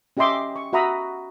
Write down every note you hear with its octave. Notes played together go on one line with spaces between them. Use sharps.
C#4 G4 D#5 E5 C6 D6
C#6
F#4 E5 F#5 A#5 B5 D#6